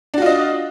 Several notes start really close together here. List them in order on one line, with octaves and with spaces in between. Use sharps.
D4 F#4 F4 D#5